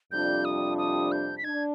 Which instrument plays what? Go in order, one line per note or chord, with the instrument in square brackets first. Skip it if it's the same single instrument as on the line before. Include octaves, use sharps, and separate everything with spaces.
[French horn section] F2 C3 G3 D4 F4 [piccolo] G6
[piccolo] D#6
D#6
G6
B6
[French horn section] D4 [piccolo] G#6